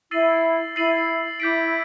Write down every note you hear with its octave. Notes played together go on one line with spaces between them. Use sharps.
E4 E6 A6 C7 D#7 F#7
E4 E6 A6 C7 D#7 F#7
E4 D6 G6 B6 D7